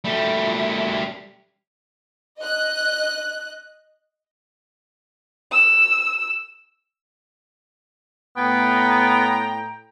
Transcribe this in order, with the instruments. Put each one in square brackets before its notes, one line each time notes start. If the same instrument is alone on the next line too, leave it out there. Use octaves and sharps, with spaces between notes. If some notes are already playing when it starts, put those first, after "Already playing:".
[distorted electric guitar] G3 A3
[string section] D#5 F#6
[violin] E6
[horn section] A2 G5 A#5 [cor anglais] B3